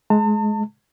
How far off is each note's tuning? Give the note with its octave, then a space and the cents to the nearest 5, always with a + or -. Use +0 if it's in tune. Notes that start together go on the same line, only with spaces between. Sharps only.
G#3 +25 A5 +40